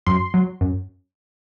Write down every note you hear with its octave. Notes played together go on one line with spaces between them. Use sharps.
F#2 C6
F#3
F#2